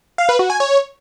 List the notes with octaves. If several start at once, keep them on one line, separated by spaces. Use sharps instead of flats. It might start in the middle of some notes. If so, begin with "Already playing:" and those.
F5
B4
F#4
G#5
C#5